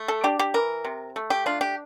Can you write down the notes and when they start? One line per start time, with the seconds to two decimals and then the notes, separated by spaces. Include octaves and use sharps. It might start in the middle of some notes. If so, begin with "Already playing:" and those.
Already playing: A3
0.08 A4
0.24 D4 G4
0.39 G4
0.54 E3 A#4
0.85 C3
1.16 A3
1.30 G4
1.46 D4 F4
1.61 G4